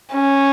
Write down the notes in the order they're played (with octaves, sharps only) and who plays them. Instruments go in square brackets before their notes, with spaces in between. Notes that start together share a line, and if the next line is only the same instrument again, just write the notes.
[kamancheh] C#4